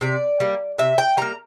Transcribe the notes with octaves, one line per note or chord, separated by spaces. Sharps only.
C3 D5
G3 A#3
C3 E5
G5
G3 A#3 A#5